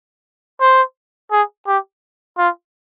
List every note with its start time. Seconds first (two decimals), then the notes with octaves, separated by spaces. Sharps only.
0.60 C5
1.31 G#4
1.67 G4
2.38 F4